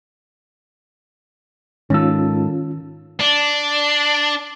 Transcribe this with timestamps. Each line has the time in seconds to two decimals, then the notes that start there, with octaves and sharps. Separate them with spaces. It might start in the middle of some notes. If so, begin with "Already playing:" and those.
1.90 G#2 D#3 C#4 F4 A4
3.20 D4